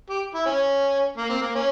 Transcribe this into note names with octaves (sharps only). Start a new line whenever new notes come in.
G4
E4
C#4
A#3
C4
A#3
C#4